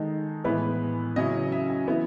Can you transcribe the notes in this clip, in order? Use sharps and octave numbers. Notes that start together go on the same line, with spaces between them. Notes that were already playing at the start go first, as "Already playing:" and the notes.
Already playing: D#3 G#3 D#4 A4
A2 E3 G#3 B3 E4 B4
C#3 F#3 C#4 E4 D#5
E5
G#5
E3 B3 E4